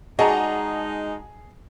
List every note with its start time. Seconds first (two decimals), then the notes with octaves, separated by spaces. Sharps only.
0.19 G#3 D#4 F#4 G#4 D5 D#5 A5 A#5